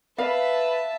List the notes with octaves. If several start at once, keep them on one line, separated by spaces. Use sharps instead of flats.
B4 E5 F5 A5